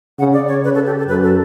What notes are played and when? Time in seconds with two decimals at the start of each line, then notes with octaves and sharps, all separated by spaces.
0.19 C#3 F#5
0.33 D5
0.48 C#5
0.63 C#3 B4
0.75 A4
0.86 G4
0.98 A4
1.08 F#2 B4
1.23 A4